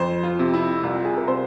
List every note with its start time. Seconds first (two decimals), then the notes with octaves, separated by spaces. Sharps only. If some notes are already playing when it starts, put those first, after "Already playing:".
Already playing: F2 C5
0.23 F4
0.39 C3
0.54 E4
0.83 C2 F4
1.05 G#4
1.17 A#4
1.28 C3 C5